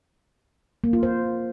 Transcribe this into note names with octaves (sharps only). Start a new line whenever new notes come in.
A#3
F4
C5